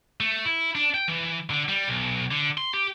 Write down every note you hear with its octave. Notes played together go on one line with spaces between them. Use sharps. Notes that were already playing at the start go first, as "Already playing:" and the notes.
A3
E4
D4
G5
E3
D3
G3
B1
D3
C6
G4